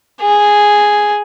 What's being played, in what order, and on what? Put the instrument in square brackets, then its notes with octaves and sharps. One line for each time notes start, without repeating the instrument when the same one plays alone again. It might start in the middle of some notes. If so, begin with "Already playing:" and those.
[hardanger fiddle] G#4